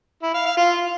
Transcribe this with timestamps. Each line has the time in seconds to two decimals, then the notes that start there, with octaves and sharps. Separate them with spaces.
0.22 E4
0.34 F5
0.45 F5
0.57 F4